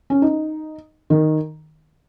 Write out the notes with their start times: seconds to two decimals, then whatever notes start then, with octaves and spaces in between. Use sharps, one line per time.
0.10 C#4
0.22 D#4
1.10 D#3